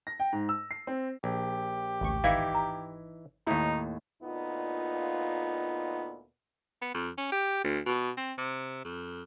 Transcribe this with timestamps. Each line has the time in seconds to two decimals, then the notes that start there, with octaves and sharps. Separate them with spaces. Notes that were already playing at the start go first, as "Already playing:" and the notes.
0.07 A#6
0.20 G5
0.33 G#2
0.49 E6
0.71 C7
0.87 C4
1.24 A#1 G4
2.01 A1 D2 C#6
2.24 G#1 E3 D#4 E4 F5 G#6
2.55 A#5
3.47 D#2 A2 D#4 E4
4.22 D2 A#2 B3 D#4 F4
6.81 B3
6.94 F2
7.17 C#4
7.32 G4
7.64 D2
7.86 B2
8.17 C4
8.38 C3
8.84 F2